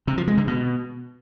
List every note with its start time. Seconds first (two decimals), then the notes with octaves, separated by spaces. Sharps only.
0.07 C3
0.17 F3
0.27 G#3
0.37 D3
0.47 B2